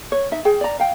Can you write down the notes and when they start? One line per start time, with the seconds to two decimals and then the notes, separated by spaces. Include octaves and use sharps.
0.12 C#5
0.32 D#4 E5
0.45 G#4 G5
0.61 D5 A#5
0.79 F5 G5